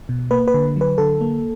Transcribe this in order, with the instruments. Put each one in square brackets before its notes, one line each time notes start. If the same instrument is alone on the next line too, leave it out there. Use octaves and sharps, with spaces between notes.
[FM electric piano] B2
A#3 B4
B4
D3
F#3 B4
D3 A4
A#3